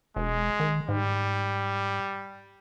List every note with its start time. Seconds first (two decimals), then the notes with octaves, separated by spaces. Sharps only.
0.16 E1 G#3
0.60 D#3
0.89 G#2 G3